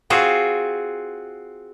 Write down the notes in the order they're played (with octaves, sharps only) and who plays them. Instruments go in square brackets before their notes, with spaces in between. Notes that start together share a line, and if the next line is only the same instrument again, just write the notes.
[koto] C4 F4 F#4 G#4